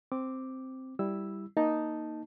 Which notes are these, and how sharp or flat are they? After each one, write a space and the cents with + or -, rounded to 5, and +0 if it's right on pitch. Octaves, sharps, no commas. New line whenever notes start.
C4 +0 D6 +0
G3 +0 E4 +0 E6 +0
A#3 +0 D#4 +0 A5 +0